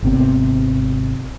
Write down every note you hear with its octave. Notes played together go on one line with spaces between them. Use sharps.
G#1 C3 B3